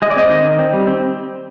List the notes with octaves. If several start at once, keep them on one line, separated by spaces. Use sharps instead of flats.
G#3 D#5
D5
C4 D#5
D#3
D#3
C4
G3
C4